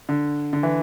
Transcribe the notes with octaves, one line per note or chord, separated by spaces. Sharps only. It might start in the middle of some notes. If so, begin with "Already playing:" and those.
D3
D3
E3